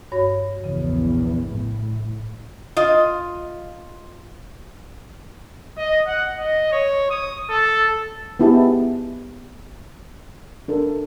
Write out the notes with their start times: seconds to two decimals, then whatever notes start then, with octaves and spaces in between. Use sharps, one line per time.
0.12 G2 F#4 C#5
0.64 A#1 E2 C#3
1.47 A2
2.77 F4 D#5
5.77 D#5
6.07 F#5
6.37 D#5
6.72 C#5
7.10 D#6
7.49 A4
8.39 B3 D#4 E4 G4 G#4 A5
10.68 D4 A4 A#4